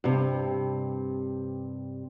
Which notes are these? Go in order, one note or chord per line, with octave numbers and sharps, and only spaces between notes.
G2 C3